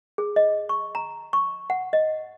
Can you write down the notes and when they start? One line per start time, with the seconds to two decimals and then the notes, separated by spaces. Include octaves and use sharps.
0.18 G#4
0.36 D#5
0.69 C#6
0.95 A#5
1.33 C#6
1.70 F#5
1.93 D#5